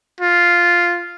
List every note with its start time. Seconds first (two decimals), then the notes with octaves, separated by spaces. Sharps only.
0.21 F4